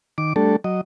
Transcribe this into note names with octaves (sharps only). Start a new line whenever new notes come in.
D#3 D6
G3 A3 D4 A4
F#3 D#5